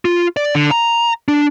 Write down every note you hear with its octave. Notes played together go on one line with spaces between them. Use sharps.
F4
D5
D3
A#5
D4